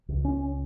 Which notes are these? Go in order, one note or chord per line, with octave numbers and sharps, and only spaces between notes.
C#2
C#4